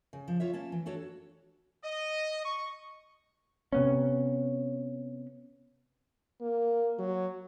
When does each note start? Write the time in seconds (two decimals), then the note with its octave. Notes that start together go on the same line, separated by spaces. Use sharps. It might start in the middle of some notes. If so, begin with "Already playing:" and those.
0.13 C#3
0.28 F3
0.40 F4 C#5 E5
0.53 A#3 C#4 A5
0.72 E3
0.86 D4 F#4 A4 C#5
1.84 D#5
2.45 C#6
3.73 C3 B3 C#4
6.41 A#3
6.99 F#3